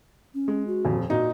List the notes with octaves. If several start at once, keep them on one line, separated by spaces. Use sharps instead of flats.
C#4
G#3
F#4
D#1 F2
A#2 D#4 F#4